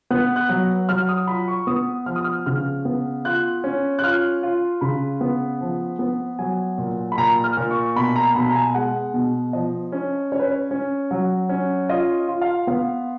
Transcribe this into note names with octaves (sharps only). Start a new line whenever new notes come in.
B3 F#6
F#6
F#3
F#3 F6
D#6
F4 B5
C#6
B3 D#6
F3 F6
D#6
F6
C#3 F6
B3
F4 F#6
C#4
F#6
F4 F6
F4
C#3 B5
B3
F3
B3
F#3 G#5
A#2
B5
A#2 A#5
F6
A#2
C#6
B2 B5
A#5
B2 B5
A#5
G#5
G#3 F#5
B2
F3 D#5
C#4
C#4 C#5
B4
C#5
C#4
F#3
C#4
F4 D#5
F4
F5
B3 F5